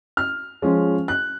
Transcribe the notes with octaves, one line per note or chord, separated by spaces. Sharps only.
F6
F3 G#3 C#4 F4
F#6